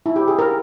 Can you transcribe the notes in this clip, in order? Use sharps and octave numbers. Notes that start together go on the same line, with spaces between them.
E4
G4
G#4
A#4